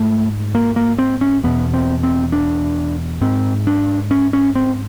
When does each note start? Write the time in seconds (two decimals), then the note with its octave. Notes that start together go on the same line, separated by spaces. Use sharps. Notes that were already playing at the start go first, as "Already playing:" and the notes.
Already playing: G#2 A3
0.55 A#3
0.76 A#3
0.98 C4
1.21 C#4
1.43 E2 B2 B3
1.74 C4
2.03 C4
2.32 D4
3.21 G#2 C4
3.67 D4
4.11 C#4
4.33 C#4
4.55 C4